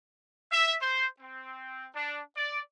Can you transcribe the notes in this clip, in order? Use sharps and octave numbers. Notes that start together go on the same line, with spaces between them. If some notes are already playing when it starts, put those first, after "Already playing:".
E5
C5
C4
D4
D5